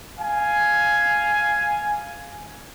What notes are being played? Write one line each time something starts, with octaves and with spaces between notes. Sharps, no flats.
F5 G#5